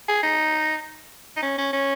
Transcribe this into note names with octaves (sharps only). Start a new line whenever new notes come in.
G#4
D#4
D#4
C#4
C#4
C#4